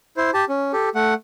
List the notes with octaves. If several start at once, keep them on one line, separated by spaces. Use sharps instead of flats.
E4 C5
G4 A5
C#4
G4 A4
A3 F#5